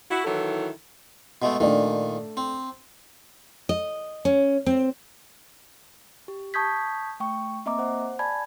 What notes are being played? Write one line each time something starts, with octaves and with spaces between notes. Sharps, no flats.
E4 F#4
D#3 E3 F#3 E4 A4
B2 G#3 A3
A#2 D#3 A3 D4
C4
D#5
C#4
C4
G4
A5 C#6 D#6 G6 G#6 B6
A3 G5 C#6
A#3 C4 D#5 E5 A#5 D6
C5 F#5
D5 G#5 A5 B5 G#6